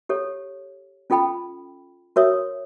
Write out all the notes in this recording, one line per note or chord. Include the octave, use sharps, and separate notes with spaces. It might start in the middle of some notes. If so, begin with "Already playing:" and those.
G4 A4 C#5
C#4 F4 A4 G5 B5
F#4 A#4 C#5 E5 D#6